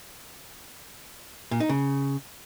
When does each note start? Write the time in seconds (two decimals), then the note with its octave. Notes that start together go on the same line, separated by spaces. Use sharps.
1.51 A#2
1.60 D#4
1.69 C#3